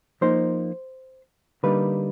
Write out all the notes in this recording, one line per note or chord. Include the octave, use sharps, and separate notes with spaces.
F3 A#3 D#4 C5
D3 G3 A#3 D#4 B4